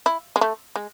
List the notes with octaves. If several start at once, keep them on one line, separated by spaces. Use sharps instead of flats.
E4
G#3
A3
G#3